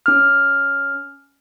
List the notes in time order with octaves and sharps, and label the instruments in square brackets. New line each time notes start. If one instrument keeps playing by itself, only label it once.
[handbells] C#4 F6